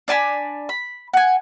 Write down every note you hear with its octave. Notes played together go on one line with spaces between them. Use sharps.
D4 D5 G#5 B5
B5
F#5 G#5